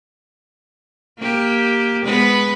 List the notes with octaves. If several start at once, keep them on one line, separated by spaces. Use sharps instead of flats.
A#3 G4
G#3 B3 B4